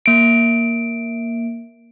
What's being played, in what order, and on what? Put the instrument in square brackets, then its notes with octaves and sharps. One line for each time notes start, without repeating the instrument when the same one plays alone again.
[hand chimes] A#3 D7